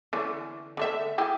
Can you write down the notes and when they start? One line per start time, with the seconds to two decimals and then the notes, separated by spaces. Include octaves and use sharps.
0.13 D3 E3 C#4
0.77 D3 A3 E5
1.18 E4 G4 G#4